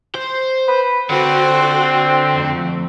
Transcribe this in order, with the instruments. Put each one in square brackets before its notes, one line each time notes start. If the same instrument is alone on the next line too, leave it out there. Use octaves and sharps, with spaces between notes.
[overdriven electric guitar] C5
[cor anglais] B4
[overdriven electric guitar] D3 [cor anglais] C4 [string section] F#4 A4 C5
[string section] F2 A3